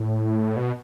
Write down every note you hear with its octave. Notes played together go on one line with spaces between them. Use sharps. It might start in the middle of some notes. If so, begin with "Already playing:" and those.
Already playing: A2
B2